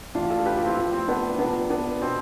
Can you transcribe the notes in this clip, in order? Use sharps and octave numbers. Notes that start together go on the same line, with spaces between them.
A2 E3 D4 F4
F4 A4
G4 B4
F4 A4
C4 E4
A2 F3
C4
B3 D4
C3 F3 B3 D4
B3 D4
B2 C4